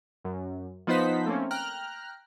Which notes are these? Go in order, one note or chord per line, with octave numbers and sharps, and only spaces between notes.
F#2
F3 B3 D#4 C5 F#5 B6
A3 A#3 C4 C#4
G5 A#5 F6 F#6